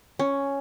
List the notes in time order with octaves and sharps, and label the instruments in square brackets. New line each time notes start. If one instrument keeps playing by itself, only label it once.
[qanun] C#4